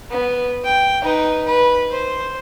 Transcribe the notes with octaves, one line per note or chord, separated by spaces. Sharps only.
B3
G5
D#4 B4
B4
C5